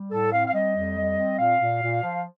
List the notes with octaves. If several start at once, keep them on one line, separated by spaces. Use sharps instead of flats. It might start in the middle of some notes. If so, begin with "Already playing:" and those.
Already playing: G3
A2 A4
C4 F5
F5
G3 D#5
F2
G3
C4
A#2 F5
A#2
A#2
F3